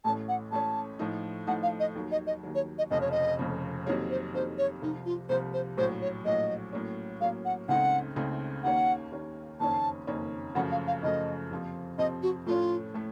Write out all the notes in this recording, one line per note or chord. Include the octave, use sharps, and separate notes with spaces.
A1 A2 A3 C#4 A5
F#5
A1 A2 A3 C#4 A5
A2 F3 A3 D#4
A2 F3 A3 D#4 F#5
F5
D#5
D#2 D#3 F#3
D#5
D#5
D#2 D#3 F#3
C#5
D#5
F1 F2 C#3 F3 D#5
C#5
D#5
F1 F2 C#3 F3
F2 C3 D#3 F#3 A#3 C#5
C5
F2 C3 D#3 F#3 A#3 C5
C#5
C2 C3 F3 D#4
F4
C2 C3 F3 C5
C5
A#1 A2 F#3 C5
C#5
A#1 A2 F#3 D#5
A2 F#3 A#3 C#4
A2 F#3 A#3 C#4 F5
F#5
C#2 C#3 A3 C4 D#4 F#5
C#2 C#3 A3 C4 D#4
D#2 D#3 A#3 C#4 F#5
D#2 D#3 A#3 C#4
F#1 F2 D#3 A#3 C#4 A5
F#1 F2 D#3 A#3 C#4
F#2 C#3 F3 A3 F#5
F5
F5
F#2 C#3 F3 A3 D#5
F2 C3 F3 C4
F2 C3 F3 C4 D#5
F#4
A2 A3 C#4 F4
A2 A3